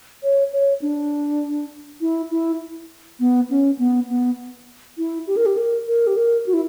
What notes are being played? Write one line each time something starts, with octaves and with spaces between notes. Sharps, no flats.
C#5
C#5
D4
E4
E4
B3
C#4
B3
B3
E4
G4
A#4
G4
A#4
A#4
G4
A#4
F#4
E4